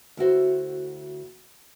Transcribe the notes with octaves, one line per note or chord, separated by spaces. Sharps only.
D2 E4 F#4 C5